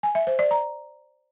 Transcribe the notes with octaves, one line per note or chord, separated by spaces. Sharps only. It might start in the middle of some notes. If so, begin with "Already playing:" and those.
G#5
E5
C5
D5
A#5